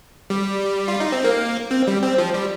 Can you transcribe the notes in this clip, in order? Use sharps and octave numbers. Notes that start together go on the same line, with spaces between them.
G3
F4
D#4
C4
A#3
C4
G3
C4
F3
G3